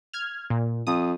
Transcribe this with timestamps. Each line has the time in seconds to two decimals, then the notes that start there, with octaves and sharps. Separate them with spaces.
0.13 F6 G#6
0.50 A#2
0.87 F2 D#6